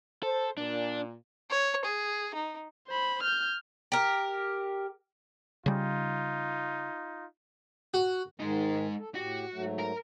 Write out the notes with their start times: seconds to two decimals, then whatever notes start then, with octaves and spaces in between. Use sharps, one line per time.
0.23 A4 C5
0.57 A#2 D4
1.50 C#5
1.85 G#4
2.35 D#4
2.88 C5 B5
3.23 F6 G6
3.92 G4 A#4
5.66 C#3 G3 D#4 F4
7.94 F#4
8.40 G#2 D#3 G#3 D#4
8.98 A4
9.15 A2 F#4 G4
9.53 G#2 F#3 A3
9.79 A#4